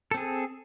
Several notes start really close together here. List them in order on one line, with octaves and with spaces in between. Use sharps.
A4 C4 G#4